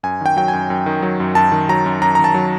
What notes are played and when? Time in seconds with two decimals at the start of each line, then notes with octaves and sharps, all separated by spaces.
0.03 F#2 G#5
0.21 D#3 G5
0.37 F#3 G5
0.48 F#2 G#5
0.70 F#2
0.86 D#3
1.02 F#3
1.20 F#2
1.35 F#2 A5
1.52 D#3
1.69 F#3 A#5
1.86 F#2
2.02 F#2 A#5
2.15 A#5
2.19 D#3
2.24 A5
2.34 F#3